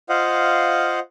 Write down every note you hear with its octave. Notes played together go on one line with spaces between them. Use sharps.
F4 C5 D#5 F5 F#5